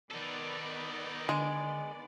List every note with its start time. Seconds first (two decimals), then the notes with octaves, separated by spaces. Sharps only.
0.11 D#3 B3 D#4 A4 D5
1.29 D3 G#3